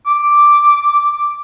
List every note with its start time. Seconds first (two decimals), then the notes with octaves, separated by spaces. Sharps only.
0.06 D6